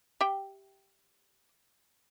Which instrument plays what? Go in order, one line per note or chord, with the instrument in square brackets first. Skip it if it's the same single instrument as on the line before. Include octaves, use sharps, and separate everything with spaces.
[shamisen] G4 E5 G5